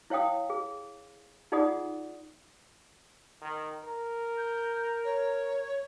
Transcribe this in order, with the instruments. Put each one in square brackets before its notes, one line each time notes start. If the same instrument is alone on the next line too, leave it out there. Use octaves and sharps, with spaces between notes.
[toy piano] E4 C#5 F5 G5 D#6
G#4
D#4 F4 G#4 D5 F#5 D#6
[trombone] D#3
A#4
[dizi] G6
C#5